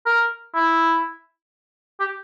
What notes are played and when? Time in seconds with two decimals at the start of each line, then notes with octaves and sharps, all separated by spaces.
0.06 A#4
0.55 E4
2.00 G4